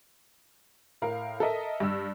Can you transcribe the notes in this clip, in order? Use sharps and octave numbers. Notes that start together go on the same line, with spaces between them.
A2 A#4 F5
A4 A#4 D#5 E5
G2 E6